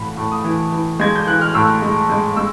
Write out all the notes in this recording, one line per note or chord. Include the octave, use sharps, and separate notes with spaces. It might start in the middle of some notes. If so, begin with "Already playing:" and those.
Already playing: A2 E3 F#5 B5
A2
D#6
E3
E3
G#3 G#6
G6
E3 F#6
F6
A2 E6
G#3
G#3
G#3 E6